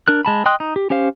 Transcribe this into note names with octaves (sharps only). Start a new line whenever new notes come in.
D4 A#4 F#6
G#3 A5 B5
D#5 G5 C6 D#6 F#6
D#4
G4
C#4 G4 C5 F5